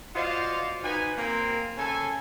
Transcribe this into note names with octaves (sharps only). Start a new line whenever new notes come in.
F4 F#4 C5 D5 D#5 F5
D#4 F#4 B4 G#5
A#3 C4
C#3 A4 G#5